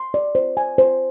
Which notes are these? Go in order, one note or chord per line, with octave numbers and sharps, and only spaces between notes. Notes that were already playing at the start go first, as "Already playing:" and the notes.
Already playing: C6
D5
C5
G#5
C5